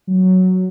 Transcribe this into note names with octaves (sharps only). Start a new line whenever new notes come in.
F#3